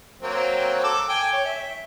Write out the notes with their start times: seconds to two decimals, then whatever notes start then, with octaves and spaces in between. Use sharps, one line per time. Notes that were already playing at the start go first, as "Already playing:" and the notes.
0.22 F#3 A#3 C4
0.84 A4 D6 E6
1.09 G5 G#5
1.33 C#5
1.45 E5